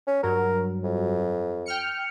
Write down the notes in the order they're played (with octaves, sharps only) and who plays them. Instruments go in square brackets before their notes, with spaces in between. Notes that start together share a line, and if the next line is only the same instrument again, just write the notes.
[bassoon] C#4
[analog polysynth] G2 F#3 [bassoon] A#4
[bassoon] F2
[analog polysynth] G5 F6 C#7